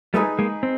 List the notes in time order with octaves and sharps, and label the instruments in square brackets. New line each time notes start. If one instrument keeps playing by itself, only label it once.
[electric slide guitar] G3 A3 [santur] D#4 G#4 B4
[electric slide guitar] G#3 A#3
C4